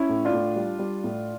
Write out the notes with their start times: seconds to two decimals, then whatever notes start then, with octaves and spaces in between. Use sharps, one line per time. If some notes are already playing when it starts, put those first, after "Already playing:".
Already playing: C#4 E4
0.09 A2
0.25 D4 F4
0.33 A2
0.56 G3
0.79 G3
1.04 A2